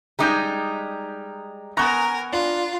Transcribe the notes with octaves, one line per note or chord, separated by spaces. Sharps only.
G3 G#3 D#4 A#5 D6 G6
B3 A#4 G#5 A#5 C#6 F#6 A#6
D4 F4